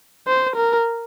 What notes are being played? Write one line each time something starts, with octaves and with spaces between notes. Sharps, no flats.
C5
A#4